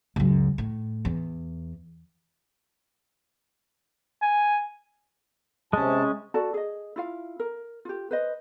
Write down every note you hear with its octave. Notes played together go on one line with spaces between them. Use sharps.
C#2 F#2
A2
E2
G#5
C3 G#3 C#4 A5
F#4 A4 D5 A5
G#4 D#5
E4 F4 F5
A#4
F4 G4
B4 C5 D#5